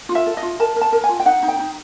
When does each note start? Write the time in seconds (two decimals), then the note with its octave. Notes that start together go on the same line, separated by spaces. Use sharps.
0.09 F4
0.15 E5
0.26 A4
0.37 D#5
0.43 F4
0.60 A#4 A5
0.76 A#4
0.81 A5
0.92 A#4
1.04 G#5
1.09 F4
1.20 G5
1.25 D#4 F#5
1.42 D#4
1.48 G5
1.59 D#4